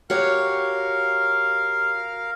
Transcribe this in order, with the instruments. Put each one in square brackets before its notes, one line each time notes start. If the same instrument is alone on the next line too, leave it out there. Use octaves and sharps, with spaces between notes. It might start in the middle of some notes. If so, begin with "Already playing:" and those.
[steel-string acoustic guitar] F#4 G4 C#5 [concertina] A#4 F5